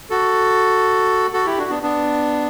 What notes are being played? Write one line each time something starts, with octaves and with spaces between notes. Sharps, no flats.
F#4 A4
F#4 A4
E4 G4
D4 F#4
B3 D4
B3 D4